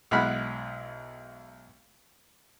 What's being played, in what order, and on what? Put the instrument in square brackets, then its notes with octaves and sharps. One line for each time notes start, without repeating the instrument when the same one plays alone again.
[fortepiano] B1 G#3 E4 F#5 B5 F6